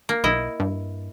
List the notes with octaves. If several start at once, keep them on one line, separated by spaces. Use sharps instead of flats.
A#3
B1 E4 D#5
G2